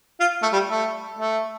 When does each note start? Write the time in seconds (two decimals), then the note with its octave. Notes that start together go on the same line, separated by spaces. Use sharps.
0.20 F4
0.42 A3
0.53 G3
0.69 A3
1.19 A3